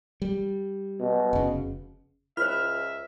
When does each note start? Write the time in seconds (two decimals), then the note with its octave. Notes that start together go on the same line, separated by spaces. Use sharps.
0.22 G3
1.00 B2
1.33 F1 C#3
2.37 C#2 F4 C5 E5 F6